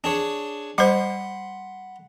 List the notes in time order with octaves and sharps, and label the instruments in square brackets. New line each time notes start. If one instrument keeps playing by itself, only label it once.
[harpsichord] D4 G#4 C#5
[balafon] G3 C5 [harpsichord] F#5 B5 C6